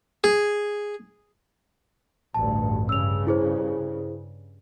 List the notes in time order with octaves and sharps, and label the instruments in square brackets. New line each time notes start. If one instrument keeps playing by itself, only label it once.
[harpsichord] G#4
[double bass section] A1 D2 G2 [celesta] A5
[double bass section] G2 C#3 [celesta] E6 F7
[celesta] E4 G#4 C5